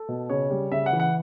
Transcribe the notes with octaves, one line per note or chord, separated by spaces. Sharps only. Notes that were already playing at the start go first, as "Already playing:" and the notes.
Already playing: A4
B2
C#3 C#5
G3
C#3 E5
F#5
E3
F#5